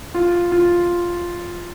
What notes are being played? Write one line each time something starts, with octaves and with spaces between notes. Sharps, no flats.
F4
F4